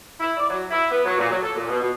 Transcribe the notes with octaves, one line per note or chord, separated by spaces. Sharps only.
E4
D5
F#3
E4
B3
F#3
A#2
F#3
A4
A#2
B2
B2